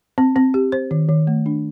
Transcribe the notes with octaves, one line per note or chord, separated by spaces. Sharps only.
C4
C4
G4
C5
D#3
D#3
A3
D4